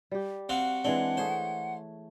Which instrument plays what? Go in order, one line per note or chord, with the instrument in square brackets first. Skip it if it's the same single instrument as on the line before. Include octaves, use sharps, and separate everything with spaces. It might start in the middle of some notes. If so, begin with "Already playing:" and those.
[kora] G3 G4
[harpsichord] C4 F#4 F5 [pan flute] F#5
[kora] E3 G#3 D4 [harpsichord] C4
[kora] A3 G#4 C#5 [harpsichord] C5